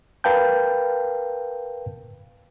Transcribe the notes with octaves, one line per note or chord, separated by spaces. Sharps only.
A#4 B4 F5 G5 A5 G6